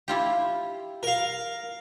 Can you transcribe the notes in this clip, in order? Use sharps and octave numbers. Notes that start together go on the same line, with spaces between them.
E4 F4 G4
A#4 F5